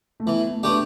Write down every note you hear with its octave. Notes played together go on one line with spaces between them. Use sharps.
A3
E3 B3
A3
A3 D4 G4 B4